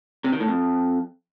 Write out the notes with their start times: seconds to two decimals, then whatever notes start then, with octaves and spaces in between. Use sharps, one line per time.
0.24 C3
0.32 D#3
0.40 A2
0.48 F2